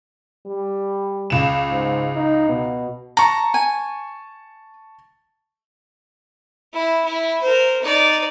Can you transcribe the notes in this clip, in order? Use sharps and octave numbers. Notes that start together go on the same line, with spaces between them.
G3
C#2 E7
G#2
D#4
B2
A5 A#5 C#6
G#5
E4
E4
A#4 C5
D#4 D5